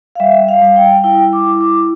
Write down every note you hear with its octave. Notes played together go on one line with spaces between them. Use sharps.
F5
G3 E5
F5
G3 F5
G5
E4 G5
D6
E4
D6